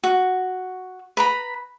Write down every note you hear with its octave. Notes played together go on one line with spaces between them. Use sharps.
F#4
B4 A#5 B5